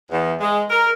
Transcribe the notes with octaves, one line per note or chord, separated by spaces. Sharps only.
E2
G#3
A#4